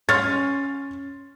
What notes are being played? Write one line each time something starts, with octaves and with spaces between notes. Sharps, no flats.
C#4 C6 F6 A6